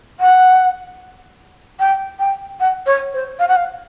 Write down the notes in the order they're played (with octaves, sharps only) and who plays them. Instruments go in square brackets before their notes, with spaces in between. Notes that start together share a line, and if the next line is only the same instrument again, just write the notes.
[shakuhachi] F#5
G5
G5
F#5
C#5
C5
F5
F#5
F5